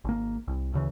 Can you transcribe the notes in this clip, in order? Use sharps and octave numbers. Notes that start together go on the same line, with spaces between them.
G#1 A#3
C2
D2 C#3 E3